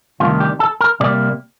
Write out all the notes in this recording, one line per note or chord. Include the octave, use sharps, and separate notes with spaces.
D2 C3 D#3 G3 D4 F4
G4
A4
A#4
C3 G3 A#3 D5